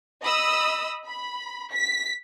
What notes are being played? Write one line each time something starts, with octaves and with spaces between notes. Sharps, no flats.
D#5 B5 D#6 E6
B5
B6